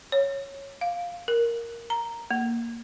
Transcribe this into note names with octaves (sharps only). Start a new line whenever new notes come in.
C#5
F5
A#4
A#5
A#3